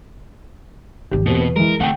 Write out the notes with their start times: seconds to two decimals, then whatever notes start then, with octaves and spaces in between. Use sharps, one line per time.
1.11 G#1 D#2 G4
1.26 E2 B2 A#3 C4 G4
1.40 B4
1.56 E3 G#3 A#4
1.80 D3 A3 C4 F#5 G5